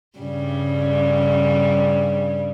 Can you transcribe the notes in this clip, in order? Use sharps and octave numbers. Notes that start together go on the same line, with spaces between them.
G2 C#3 G3